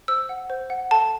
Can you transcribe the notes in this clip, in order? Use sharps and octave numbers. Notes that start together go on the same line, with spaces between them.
C5 E6
F#5
C5
F#5
A4 A5